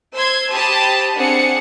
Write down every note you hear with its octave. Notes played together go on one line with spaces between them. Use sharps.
C5 C6 E6 G#6
G4 C5 A5 B5 D#6
C4 D4 G#4 F#5 C#7